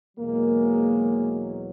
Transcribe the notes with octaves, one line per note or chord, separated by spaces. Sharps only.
E2 B2 F#3 G#3 A#3